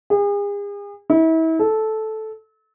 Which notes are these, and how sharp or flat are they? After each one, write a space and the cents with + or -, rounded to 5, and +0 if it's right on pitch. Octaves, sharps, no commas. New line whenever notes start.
G#4 -40
E4 -35
A4 -10